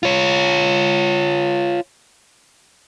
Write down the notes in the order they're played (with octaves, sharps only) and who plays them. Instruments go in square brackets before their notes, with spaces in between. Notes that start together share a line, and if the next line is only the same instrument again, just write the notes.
[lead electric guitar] F4 C#5